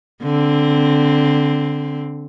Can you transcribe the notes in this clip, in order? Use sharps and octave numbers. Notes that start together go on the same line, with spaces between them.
D3 C4